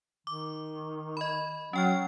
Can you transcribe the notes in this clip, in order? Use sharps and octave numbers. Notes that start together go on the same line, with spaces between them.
D#3 D6
D#5 B5
F#3 C#4 G5 F6